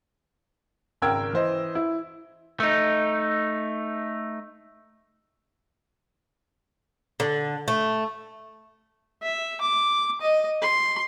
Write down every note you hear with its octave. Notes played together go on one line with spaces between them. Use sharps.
G#1 C#3 A#4 G5 E6 G#6
E3 C5 D#5
E4
A3 D#4
D3
A3
E5
D6
D#5
C6